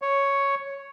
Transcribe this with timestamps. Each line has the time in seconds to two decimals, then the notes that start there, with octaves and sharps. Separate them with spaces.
0.02 C#5